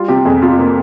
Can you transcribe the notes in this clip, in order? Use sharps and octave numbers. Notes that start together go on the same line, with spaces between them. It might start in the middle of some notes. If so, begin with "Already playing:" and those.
Already playing: G3 F4
C3 G4
F2 G#4
C3 F4
A#3